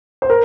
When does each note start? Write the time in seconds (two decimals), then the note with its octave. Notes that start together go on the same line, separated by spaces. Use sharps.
0.22 C5
0.30 A#4